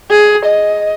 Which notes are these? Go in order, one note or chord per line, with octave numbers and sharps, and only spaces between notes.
G#4
D#5